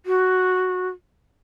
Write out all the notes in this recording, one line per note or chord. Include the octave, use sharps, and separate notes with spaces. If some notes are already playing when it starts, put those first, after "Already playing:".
F#4